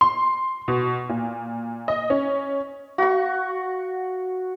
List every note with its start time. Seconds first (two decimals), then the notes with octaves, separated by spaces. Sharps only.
0.01 C6
0.68 B2
1.09 A#2
1.88 D#5
2.10 C#4
2.98 F#4 C#6